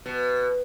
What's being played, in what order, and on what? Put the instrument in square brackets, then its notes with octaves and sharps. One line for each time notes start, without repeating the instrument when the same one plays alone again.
[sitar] B2